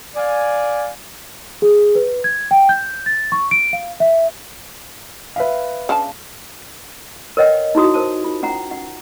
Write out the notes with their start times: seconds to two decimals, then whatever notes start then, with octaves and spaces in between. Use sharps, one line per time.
0.16 D5 F5 G#5
1.62 G#4
1.95 B4
2.24 G#6
2.51 G5
2.69 G6
3.06 A6
3.32 C#6
3.51 D7
3.73 F5
4.00 E5
5.36 B4 E5 F5
5.89 C#3 D4 A5
7.37 A#4 B4 C#5 D#5 F#5 G5
7.75 D#4 E4 F#4 D#6
7.94 A#4 C5 A5
8.24 F4
8.43 C#4 F#5 A#5
8.71 F#5